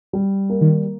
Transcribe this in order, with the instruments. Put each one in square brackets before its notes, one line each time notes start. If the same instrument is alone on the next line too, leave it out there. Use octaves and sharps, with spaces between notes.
[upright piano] G3
A#3
[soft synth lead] D#3